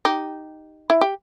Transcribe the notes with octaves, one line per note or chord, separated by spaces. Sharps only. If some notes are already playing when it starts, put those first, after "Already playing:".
D#4 G4
E4
G4